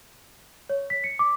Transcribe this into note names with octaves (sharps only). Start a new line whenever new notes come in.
C#5
B6
C#7
D6